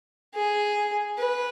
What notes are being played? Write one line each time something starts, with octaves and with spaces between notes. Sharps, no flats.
G#4
B4